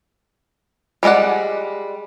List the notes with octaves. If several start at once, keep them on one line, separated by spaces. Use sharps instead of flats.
G3 G#3 A4 D5 F#5